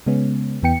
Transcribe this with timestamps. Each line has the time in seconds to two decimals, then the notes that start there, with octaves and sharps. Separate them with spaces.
0.06 C#3 G#3 B3 C#4
0.62 E2 E3 B3 G5 C#7